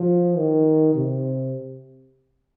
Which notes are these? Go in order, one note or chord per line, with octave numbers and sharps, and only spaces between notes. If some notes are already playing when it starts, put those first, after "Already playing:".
Already playing: F3
D#3
C3